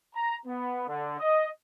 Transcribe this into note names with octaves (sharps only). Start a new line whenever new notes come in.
A#5
B3
D3
D#5